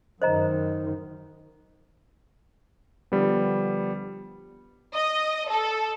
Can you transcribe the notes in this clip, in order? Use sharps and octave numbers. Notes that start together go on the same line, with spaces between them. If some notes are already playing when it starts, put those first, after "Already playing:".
F#2 D#3 C5 D#5 A#5
D3 F3 G3 B3
D#5
A4